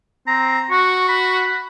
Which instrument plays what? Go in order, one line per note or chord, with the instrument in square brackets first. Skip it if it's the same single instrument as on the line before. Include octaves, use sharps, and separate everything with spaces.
[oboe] C4 [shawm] A#5
[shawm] F#4 [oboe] C#6
[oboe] B5